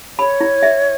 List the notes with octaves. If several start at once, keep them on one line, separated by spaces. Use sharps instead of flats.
C#5 B5
E4
E5